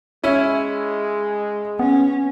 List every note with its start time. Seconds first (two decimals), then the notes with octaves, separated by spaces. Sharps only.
0.24 G#3 C#4 E4
1.79 B3 C#4